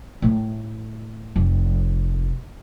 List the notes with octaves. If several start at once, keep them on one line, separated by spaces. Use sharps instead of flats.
A2 A3
F1